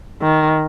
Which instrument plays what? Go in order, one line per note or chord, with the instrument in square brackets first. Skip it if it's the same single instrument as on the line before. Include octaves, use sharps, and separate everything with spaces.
[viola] D#3